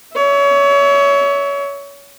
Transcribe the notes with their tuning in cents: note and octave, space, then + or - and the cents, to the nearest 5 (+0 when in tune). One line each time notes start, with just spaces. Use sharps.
C#5 +25 E5 -15